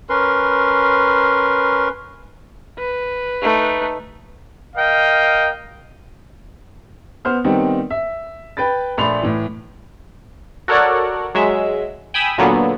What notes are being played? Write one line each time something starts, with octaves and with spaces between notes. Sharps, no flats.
C#4 A#4 B4 C6
B4
A3 D#4
A#4 D#5 F5 G5
B3 C5 F6
D#3 G3 B3 C4 D#4
E5
B4 G5 B5 A6
A#1 A3 D5 B5 C6 F7
A2 E3
F#4 A4 A#4 C#5 D5 F#5
F#3 G#3 E5
G5 G#5 B5 D#6 E6
A#2 D3 F#3 A#3 B3